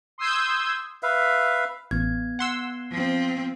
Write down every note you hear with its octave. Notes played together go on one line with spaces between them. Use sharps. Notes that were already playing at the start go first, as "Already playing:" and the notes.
C6 D#6 E6 G6 G#6
B4 E5 F5
A1 B3 G#6
F#5 C6 E6
F3 C4